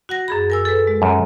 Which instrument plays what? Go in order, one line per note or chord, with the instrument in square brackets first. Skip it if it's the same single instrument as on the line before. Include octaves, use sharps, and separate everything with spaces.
[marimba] F#4 F#5 A#6
F#2 G#4 B5
A#4 G#5 E6
A4 B4
G#3
[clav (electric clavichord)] F#2